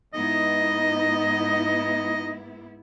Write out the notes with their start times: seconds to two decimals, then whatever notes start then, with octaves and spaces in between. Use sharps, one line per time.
0.14 G#2 B3 D#4 E4 D#5